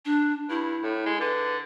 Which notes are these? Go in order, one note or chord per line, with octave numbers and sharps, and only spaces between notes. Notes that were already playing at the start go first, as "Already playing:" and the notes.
D4
G2 E4
A2
G#3
D3 B4